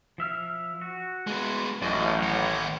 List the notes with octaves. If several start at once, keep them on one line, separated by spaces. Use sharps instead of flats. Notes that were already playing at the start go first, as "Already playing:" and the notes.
F3 E5 F6
F#4
G#3 B3
A1 F#2 D5 D#5 C#6
D#2 C#5 F#5